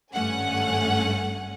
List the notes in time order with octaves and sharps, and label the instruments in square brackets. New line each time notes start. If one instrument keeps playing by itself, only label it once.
[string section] G#1 G2 A3 C#4 F#5 G#5